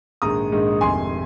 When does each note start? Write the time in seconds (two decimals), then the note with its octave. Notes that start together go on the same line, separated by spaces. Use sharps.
0.22 A#1 G#2 D#3 G#3 A#5 D#6
0.52 A#1 G#2 D#3 G#3
0.81 F1 F2 D#3 G#3 G#5 C6